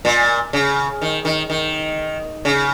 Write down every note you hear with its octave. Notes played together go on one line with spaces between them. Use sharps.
A#2
C#3
D#3
D#3
D#3
C#3